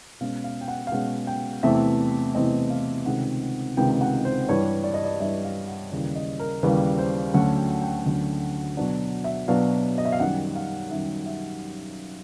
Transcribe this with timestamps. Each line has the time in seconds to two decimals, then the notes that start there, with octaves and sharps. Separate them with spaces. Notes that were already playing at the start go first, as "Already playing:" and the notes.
0.21 B2 G#3 C#4 F5
0.44 F5
0.61 G5
0.68 F#5
0.87 F5
0.92 B2 G#3 C#4 F#5
1.27 G5
1.63 E2 C3 E3 A3 C4 E5
2.35 E2 C3 E3 A3 C4 D#5
2.70 F5
3.06 C#2 C3 D#3 G#3 B3 F#5
3.77 C#2 C3 D#3 G#3 B3 G5
4.01 F#5
4.25 C5
4.49 G2 E3 G3 C#5
4.84 D5
4.94 D#5
5.04 D5
5.20 G2 E3 G3 E5
5.44 F5
5.68 F#5
5.91 D#2 C#3 E3 G3
6.15 D#5
6.40 A#4
6.63 D#2 C#3 E3 G3 B4
6.98 C5
7.34 D2 D3 F#3 A3 C#4 F#5
7.58 G5
7.82 G5
8.06 D2 D3 F#3 A3 C#4
8.77 B2 F#3 B3 D4 F#5
9.24 E5
9.48 B2 F#3 B3 D4 F5
9.98 D#5
10.05 E5
10.12 F5
10.20 F#2 D#3 G3 F#5
10.55 F5
10.91 F#2 D#3 G3 E5
11.26 E5